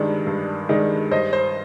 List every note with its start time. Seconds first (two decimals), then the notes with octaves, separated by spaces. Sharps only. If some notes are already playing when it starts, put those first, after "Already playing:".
Already playing: G2 D#3 G#3 D4
0.27 G2
0.69 D#3 G#3 D4
1.11 G2 C5 D#5
1.33 C5